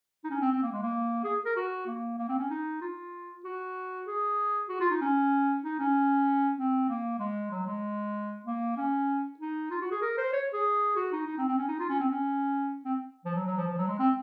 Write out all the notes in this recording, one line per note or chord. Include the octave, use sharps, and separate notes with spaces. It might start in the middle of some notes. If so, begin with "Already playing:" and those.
D#4
C#4
C4
C4
A#3
G#3
A#3
G#4
A#4
F#4
A#3
A#3
C4
C#4
D#4
F4
F#4
G#4
F#4
F4
D#4
C#4
D#4
C#4
C4
A#3
G#3
F#3
G#3
A#3
C#4
D#4
F4
F#4
G#4
A#4
C5
C#5
G#4
F#4
D#4
D#4
C4
C4
C#4
D#4
F4
C#4
C4
C#4
C4
F3
F#3
F#3
F3
F3
F#3
G#3
C4